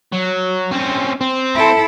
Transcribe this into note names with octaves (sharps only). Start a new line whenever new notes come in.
F#3
C4 C#4
C4
E4 A4